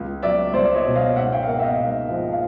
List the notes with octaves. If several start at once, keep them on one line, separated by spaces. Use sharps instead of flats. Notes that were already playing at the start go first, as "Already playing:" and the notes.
Already playing: C#2
F#3 D5 E5
C#2 C5 D5
C#5 D#5
B2
D#5 F5
G#2 E5 F#5
F5 G5
F5
A#3 E5 F#5
E5
D#5 F5
G#2
F3
F5